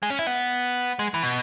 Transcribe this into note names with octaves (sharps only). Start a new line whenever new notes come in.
G#3
C#4
E4
B3
G#3
E3
B2